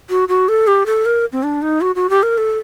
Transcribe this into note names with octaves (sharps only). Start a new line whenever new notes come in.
F#4
F#4
A4
G4
A4
A#4
C4
D4
D#4
F#4
F#4
G4
A#4
A4